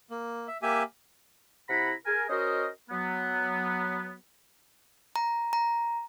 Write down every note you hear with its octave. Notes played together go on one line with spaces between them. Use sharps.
A#3
E5
A#3 G4 E5 G#5
C3 E4 F#5 A#5 B5
G#4 A#4 G#5
C#4 F#4 A#4 C5 D#5
F#3 B3
A#5
A#5